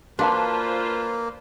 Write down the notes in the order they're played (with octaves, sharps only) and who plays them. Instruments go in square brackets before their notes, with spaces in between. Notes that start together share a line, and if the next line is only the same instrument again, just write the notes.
[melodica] A#3 [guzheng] D4 [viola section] F4 B4 C5 [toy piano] F#4 F5 A5